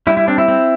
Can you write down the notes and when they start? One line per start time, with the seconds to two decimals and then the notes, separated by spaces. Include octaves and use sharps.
0.07 G3 E4
0.17 E4
0.28 C4 D4
0.38 E4
0.48 C4